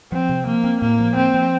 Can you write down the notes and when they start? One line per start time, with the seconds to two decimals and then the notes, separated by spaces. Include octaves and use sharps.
0.12 F3 C4
0.29 C3
0.46 F3 A#3
0.64 C4
0.82 A2 A#3
0.99 F3
1.16 A#3 C4
1.34 F3